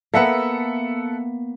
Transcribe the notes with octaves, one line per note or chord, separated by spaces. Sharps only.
A#3 B3 A4 E5 F#5